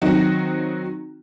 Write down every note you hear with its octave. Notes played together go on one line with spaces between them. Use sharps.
D#3 F#3 C4 D#4 F#4